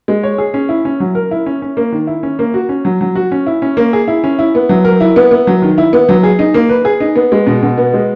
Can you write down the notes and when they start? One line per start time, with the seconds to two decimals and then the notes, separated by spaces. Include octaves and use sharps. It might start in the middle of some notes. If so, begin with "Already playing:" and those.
0.08 G#3
0.23 C#5
0.38 G#4
0.54 C#4
0.69 E4
0.85 C#4
1.00 F#3
1.15 A#4
1.31 E4
1.46 C#4
1.62 C#4
1.77 A#3
1.92 D#3
2.07 E4
2.23 C#4
2.39 A#3
2.54 F#4
2.69 C#4
2.85 F#3
3.01 F#3
3.15 F#4
3.32 C#4
3.46 E4
3.62 C#4
3.77 A#3
3.93 G#4
4.08 E4
4.24 C#4
4.39 E4
4.55 B3
4.69 F#3
4.85 A#4
5.00 E4
5.16 B3
5.31 B3
5.47 F#3
5.62 D#3
5.78 E4
5.93 B3
6.09 F#3
6.23 G#4
6.39 D#4
6.54 A#3
6.69 B4
6.85 G#4
7.00 D#4
7.16 B3
7.32 G#3
7.47 B2
7.63 B2
7.78 B3
7.94 G#3